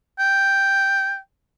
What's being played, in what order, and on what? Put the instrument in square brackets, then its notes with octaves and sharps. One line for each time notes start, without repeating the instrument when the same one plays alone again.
[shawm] G5